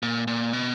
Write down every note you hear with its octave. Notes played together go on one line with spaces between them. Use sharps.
A#2
A#2
B2